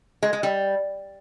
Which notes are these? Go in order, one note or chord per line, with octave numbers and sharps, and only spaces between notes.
G#3
G#3
G3